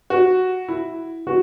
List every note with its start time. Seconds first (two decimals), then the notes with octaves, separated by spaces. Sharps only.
0.10 F#4
0.68 E4
1.27 F#4